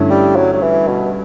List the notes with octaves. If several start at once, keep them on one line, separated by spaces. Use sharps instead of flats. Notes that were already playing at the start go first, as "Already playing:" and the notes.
Already playing: G2 D3 A3 C#4 E4
G3
F#3
F#3
E3
B2